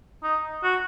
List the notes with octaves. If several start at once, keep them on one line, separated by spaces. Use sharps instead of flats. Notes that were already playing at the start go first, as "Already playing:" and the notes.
D#4
F#4